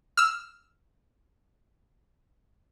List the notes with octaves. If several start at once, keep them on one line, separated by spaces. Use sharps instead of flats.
E6 F6